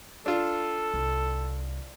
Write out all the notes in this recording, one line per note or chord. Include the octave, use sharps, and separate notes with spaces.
D4 F4 A4
C2